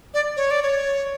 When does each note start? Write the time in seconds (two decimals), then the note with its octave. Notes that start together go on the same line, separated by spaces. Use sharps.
0.14 D5
0.37 C#5
0.51 D5
0.63 C#5